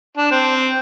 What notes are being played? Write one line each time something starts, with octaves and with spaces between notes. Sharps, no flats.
D4
C4